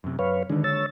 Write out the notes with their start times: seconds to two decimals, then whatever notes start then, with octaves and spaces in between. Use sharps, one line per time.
0.04 F#2 C3
0.19 F#2 B4 C#5 F5
0.50 D3 D#3 G#3 D4
0.64 C#5 E6 A6